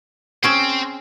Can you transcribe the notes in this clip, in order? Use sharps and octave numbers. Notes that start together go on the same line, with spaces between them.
C4 C#4 G#4 C5 G5